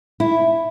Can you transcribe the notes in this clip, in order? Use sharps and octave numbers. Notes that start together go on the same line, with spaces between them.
E4